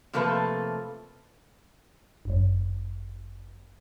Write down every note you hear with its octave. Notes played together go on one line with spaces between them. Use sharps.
C3 F3 A3 A#3 A4 B4
G1 F#2